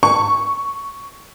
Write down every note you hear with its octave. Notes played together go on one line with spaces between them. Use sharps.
C#6